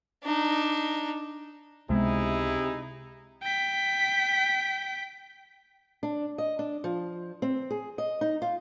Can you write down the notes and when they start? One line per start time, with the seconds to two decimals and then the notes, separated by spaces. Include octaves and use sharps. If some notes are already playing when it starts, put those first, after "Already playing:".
0.24 D4 D#4
1.89 C#2 C3 G#3 B3 D#4 E4 G#4
3.42 G5 B6
6.03 D4
6.38 D#5
6.59 D4
6.84 F3
7.42 C4
7.71 G#4
7.98 D#5
8.21 D#4
8.42 F4